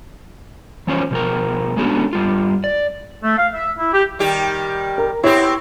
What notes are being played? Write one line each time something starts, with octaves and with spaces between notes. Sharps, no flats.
E3 F3 C#4 F4 C5 C#5
B2 F3 A#4
G#3 A3 B3 C#4 D4 F#4
G2 G3 F4
D5
A3
F5
E5
E4
G4
D#3 G3 G4
A#4
B3 C4 E4 G4 C#5